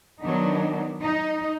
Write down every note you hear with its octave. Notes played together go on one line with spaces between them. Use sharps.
D#3 F#3 B3 D4 D#4
D#4